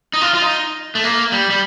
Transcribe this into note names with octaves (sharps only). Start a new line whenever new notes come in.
D#4
F4
F4
D#4
A3
A#3
G3
G3